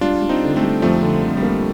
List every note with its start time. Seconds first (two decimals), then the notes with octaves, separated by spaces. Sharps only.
0.01 G3 D4 F4
0.22 G3
0.29 C4 D#4
0.43 D3
0.56 A3 C4
0.63 G3
0.82 F2 F3 A3
1.02 D3
1.23 D3
1.37 G3
1.43 A#3